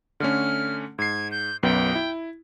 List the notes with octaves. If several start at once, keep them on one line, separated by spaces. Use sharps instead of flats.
D3 A3 C#4 F6
G#2 G#6 C7
G6
B1 F#2 B3 G5
E4